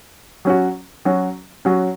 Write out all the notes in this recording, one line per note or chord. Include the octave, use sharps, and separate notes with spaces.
F#3 C#4 F#4
F#3 C#4 F#4
F#3 C#4 F#4